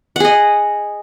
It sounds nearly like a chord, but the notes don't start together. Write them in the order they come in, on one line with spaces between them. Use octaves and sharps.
F#5 G#4 D#5